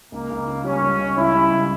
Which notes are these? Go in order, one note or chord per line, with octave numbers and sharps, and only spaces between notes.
C#2 A#3
C#2
C#3
G3 C#4
C#2
C#2
C#3 E4
G3
C#2